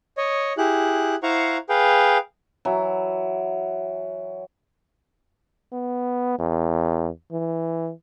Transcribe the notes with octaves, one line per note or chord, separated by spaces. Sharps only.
C#5 D#5
E4 G4 G#4 F#6
E4 C5 F5 F#5 A#5 C#6
G#4 B4 F5 G5
E3 F#3
B3
E2
E3